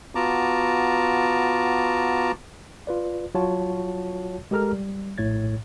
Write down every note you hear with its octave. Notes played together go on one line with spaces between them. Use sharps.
B3 F4 F#4 A5 A#5 D6
F4 B4 D5
F#3 F4 F#4 C#5 A5
G#3 G4 A4 A#4 A#5 F6
G3
A#1 A2 C#5 G#6 A6